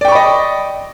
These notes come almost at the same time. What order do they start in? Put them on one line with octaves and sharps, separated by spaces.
D5 G5 C#6 B5 D#5